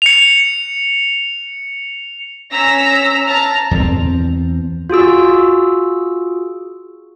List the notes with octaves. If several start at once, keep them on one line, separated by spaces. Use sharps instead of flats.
C#7 F7
C#4 A#5 E6 A#6 B6
A5 A#5 F6
E2 C4
F4 F#4 G#4 E6